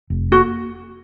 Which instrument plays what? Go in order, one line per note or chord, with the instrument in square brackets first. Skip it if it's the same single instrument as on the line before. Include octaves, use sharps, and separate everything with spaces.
[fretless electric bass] F1
[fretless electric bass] A#3 [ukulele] F#4